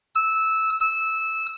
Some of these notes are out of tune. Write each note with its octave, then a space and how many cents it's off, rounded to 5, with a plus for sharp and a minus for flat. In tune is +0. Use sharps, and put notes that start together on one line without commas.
E6 -15
E6 -15